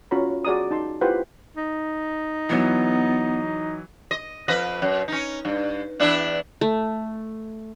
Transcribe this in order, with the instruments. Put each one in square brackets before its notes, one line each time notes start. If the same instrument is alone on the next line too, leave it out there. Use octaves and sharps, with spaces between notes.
[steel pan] C#4 F4 F#4 C#5 A#5 B5
F#4 G#4 D5 A#5 D#6
D#4 A5 C6
E4 F4 G4 B4 C5 F#5
[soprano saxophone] D#4
[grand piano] E3 F#3 [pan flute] B3
[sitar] D#5
F2 B4 D#5
F#2
C#4 D#4
G2
E2 D4 E4
[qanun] A3